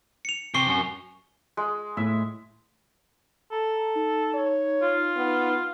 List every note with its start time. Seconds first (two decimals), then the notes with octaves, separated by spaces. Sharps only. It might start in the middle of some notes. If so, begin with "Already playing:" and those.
0.25 C#7 F7
0.54 C3 C#6 C7 G7
0.67 F#2
1.57 G#3
1.97 A2 E5
3.52 A4 A#5
3.95 D#4
4.34 C#5
4.82 F4
5.17 B3